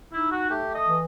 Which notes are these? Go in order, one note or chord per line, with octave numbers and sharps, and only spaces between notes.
D#4 E4
F#4
A3 G4
D#5
E3